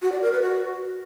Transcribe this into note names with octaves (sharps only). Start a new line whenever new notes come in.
F#4
D5
A#4
B4
F#4